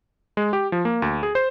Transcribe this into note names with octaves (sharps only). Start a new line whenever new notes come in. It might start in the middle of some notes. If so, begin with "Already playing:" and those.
G#3
G4
F3
A#3
D2
G#4
C5